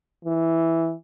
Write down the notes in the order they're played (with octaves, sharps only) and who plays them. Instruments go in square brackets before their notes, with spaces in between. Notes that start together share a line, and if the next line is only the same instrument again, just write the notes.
[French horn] E3